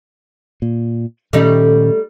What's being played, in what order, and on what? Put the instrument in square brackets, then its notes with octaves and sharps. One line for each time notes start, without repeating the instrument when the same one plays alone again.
[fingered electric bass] A#2
[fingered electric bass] A#2 D#3 C#4 [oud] G3 A3 D#4